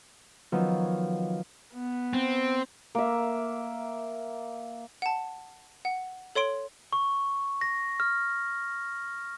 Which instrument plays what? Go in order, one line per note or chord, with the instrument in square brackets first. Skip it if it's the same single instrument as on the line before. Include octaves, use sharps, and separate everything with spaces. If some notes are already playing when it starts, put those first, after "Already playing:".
[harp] D#3 F3 F#3 B3 C#4
[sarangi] B3
[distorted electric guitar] C4
[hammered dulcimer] A#3 E5
[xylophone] F#5 A5
F#5
A4 C#5 C6 D7
[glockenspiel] C#6
A#6
F6